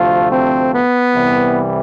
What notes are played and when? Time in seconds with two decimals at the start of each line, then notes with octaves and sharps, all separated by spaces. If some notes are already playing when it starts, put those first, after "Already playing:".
Already playing: D2 C3 F3 A3 F4
0.30 C4
0.73 B3
1.15 C2 C3 E3 G3